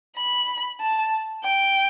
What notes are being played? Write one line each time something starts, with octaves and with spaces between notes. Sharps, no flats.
B5
A5
G5